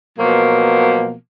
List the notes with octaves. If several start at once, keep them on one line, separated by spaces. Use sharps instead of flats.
B2 F3 F#3 A#3